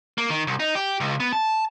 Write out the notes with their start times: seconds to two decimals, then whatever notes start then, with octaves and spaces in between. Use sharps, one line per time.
0.18 A#3
0.30 D#3
0.47 C2
0.60 D#4
0.75 G4
1.00 C#2
1.20 B3
1.33 A5